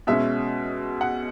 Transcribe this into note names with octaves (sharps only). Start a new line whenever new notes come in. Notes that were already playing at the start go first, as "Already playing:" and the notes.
B2 G#3 C#4 E5
F#5